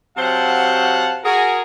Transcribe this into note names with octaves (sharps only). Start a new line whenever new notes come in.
C3 F#3 C5 F5 F#5 A5
F#4 G#4 A#4